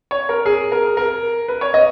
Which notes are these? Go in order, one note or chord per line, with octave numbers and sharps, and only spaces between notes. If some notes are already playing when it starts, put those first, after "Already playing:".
C#5
A#4
G#4
A#4
A#4
B4
C#5
D#5